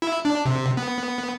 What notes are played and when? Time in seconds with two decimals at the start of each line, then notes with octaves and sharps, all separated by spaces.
0.02 E4
0.25 D4
0.45 C3
0.77 B3